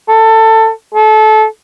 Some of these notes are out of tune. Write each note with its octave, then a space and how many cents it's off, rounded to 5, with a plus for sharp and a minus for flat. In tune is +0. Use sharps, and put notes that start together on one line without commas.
A4 +20
A4 -25